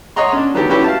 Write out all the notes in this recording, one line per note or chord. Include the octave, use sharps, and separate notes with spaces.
C#5 D#5 F#5 A#5 C6
C#4 D4
D3 D#3 F#3 B3 D4 G4
C#4 E4 F#4 G4 B4 C#5
F5 A5